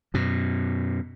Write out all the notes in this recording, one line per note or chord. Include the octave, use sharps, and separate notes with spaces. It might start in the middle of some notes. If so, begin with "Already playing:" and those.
F#2 B2